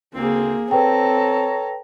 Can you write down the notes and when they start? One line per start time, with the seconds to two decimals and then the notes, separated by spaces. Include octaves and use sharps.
0.14 D2 C#3 A#3 C4 G#4
0.71 C4 A4 B4 C#5 G5 A#5